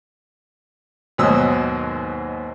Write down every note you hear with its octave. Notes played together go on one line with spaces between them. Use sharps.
D#2 G#2 B2 F#3 D#6 E6